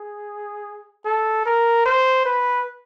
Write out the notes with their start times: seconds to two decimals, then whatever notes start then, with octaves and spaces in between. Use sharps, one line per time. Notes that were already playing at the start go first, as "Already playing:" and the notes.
Already playing: G#4
1.05 A4
1.46 A#4
1.86 C5
2.25 B4